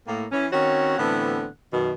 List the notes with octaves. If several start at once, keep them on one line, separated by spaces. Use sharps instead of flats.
A2 A#3
E3 C#4
D#3 C4 C#4 F#4 C#5
A2 D3 E3 B3 C4 F#5
F#2 B2 D#3